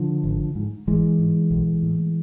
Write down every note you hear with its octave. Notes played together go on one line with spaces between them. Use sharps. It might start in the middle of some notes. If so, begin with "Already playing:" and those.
Already playing: D3 F3
G#1
G#2
G#1 E3 G#3
G#2
B1
A2